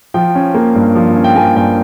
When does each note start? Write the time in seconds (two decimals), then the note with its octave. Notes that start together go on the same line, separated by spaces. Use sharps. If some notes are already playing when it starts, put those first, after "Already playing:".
0.14 F3 G5
0.35 C#4
0.55 A#3
0.75 G2
0.95 F3
1.16 C#4
1.24 G5
1.36 A#3 G#5
1.56 G2 G5